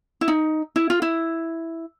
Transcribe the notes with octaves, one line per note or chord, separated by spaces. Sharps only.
E4
D#4
E4
F4
E4